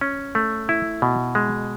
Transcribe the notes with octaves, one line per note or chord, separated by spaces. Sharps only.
C#4
A3
E4
B2
G#3